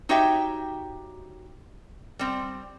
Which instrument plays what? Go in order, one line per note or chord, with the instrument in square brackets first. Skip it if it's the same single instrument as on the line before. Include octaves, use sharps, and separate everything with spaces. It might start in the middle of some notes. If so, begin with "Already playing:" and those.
[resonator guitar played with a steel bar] D#4 F#4 G4 C#5 E5 G5
G3 C4